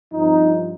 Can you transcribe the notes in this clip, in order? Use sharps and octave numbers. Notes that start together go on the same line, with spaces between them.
G2 F3 C4 D#4